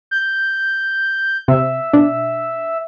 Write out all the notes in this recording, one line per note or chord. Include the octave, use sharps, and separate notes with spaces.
G6
C3 E5
B2 D4